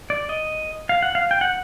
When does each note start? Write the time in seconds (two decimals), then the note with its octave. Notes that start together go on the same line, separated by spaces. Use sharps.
0.10 D5
0.29 D#5
0.89 F5
1.03 F#5
1.15 F5
1.31 G5
1.41 F#5